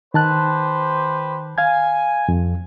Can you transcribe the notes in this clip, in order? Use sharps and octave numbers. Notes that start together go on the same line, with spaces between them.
D#3 G4 B4 C5 A5 F#6
F5 G#5 G#6
F2